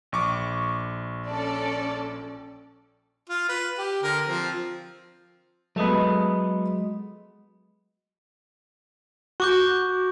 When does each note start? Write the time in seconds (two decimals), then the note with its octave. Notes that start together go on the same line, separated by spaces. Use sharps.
0.12 A#1 C#6 D6
1.26 C#4 A4 D5
3.29 F4
3.49 B4
3.78 G4
4.03 D3 A#4
4.26 F3 C4
5.76 F#3 G#3 A3 B3 D#5
9.40 F#4 C#6 D6 G6